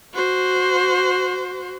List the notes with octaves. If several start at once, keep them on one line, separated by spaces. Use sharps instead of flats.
F#4 C5